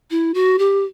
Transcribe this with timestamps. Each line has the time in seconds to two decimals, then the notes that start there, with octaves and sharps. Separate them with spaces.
0.11 E4
0.34 F#4
0.59 G4